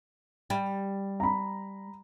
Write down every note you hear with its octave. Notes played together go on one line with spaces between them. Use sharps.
G3
A#5 B5